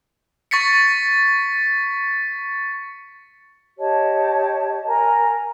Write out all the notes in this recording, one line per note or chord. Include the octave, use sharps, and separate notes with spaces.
C#6 A6 B6 C#7
G4 C#5 D#5 A5
A#4 G#5 A#5